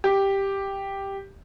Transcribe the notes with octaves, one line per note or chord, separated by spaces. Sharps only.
G4